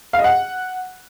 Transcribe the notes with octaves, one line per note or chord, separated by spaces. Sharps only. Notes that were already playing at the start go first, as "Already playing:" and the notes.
F5
D#5
F#5